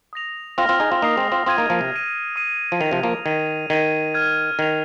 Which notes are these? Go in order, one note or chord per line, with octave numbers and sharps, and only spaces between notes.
D#6 A#6 F7
C4 F4 F6 A#6 F7
C4 F4
D#4 G#4
C4 F4
A#3 D#4 D#6 C7 F7
G#3 C4
C4 F4
C4 F4 D#6 G#6 D#7
A#3 D#4
F3 A#3
C3
G#6 D#7
D#6 C7 D#7
F3
D#3 G#6 F7
C3 F3
F3 A#3
D#3 G#6 D#7
D#3 G#6 D#7
F6 G#6 D#7
D#3 G#6 C7 F7